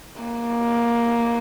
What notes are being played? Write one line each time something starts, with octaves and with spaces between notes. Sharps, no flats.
A#3